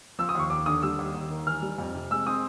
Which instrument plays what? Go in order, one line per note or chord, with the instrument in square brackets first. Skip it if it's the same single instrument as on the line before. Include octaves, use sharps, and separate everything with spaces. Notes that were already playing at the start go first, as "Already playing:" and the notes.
[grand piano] F3 E6
D#6
D#2 C#6
D#2 D6
D3 D#6
G3 E6
D#2
D#2
D#3
E3 F6
G3
F2
C3
G#3 E6
C4 D#6